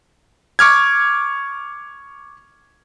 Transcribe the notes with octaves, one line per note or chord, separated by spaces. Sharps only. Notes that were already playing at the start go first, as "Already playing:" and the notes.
C#6 D6 F6 G#6